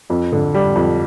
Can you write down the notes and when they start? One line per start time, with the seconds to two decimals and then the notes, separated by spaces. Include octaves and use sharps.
0.10 F2
0.32 D3
0.54 G3
0.76 F2